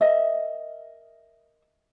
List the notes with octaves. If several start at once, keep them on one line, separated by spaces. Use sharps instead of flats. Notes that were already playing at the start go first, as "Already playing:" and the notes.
A#4 D#5 E5